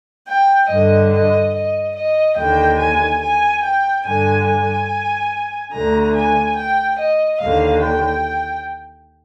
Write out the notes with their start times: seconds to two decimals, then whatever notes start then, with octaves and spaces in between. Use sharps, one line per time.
0.27 G5
0.69 G2 D3 D#5
1.12 D#5
1.54 D#5
1.95 D#5
2.37 D#2 D3 G5
2.80 G#5
3.21 G#5
3.63 G5
4.05 G2 D3 G#5
4.46 G#5
5.72 D2 D3 A#5
6.15 G#5
6.56 G5
6.98 D#5
7.40 D#2 D3 F5
7.82 G5